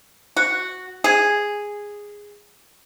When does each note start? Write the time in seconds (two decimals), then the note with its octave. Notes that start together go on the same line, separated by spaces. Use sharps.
0.37 F#4
1.04 G#4